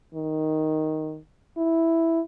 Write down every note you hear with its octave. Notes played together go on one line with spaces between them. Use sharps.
D#3
E4